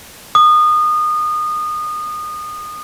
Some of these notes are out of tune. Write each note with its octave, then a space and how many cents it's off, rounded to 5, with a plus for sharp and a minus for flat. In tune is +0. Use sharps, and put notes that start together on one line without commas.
D#6 -25